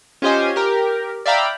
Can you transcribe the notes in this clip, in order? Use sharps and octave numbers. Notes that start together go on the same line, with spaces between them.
C#4 F4 G4 C5 D#5 G#5
G4 A#4
D5 E5 F5 G5 A#5 B5